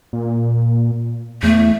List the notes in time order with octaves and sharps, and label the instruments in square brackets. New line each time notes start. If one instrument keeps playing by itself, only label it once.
[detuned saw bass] A#2
[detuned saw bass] E2 [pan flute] A3